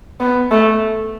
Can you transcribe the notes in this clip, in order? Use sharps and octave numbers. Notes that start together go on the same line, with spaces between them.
B3
A3